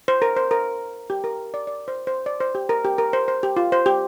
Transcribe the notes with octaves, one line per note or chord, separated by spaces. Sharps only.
C5
A#4
C5
A#4
G4
A#4
D5
D5
C5
C5
D5
C5
G4
A#4
G4
A#4
C5
C5
G4
F4
C5
G4